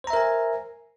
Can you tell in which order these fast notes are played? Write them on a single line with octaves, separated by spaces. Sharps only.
C5 A#5 E5 A#4 G#5